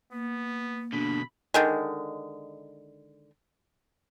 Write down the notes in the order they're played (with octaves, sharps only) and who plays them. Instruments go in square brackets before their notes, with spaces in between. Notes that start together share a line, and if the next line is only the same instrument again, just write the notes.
[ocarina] A#3 [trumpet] B3
[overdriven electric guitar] B2 D3 [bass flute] D4 [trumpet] B5
[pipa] D3 D#3 G#3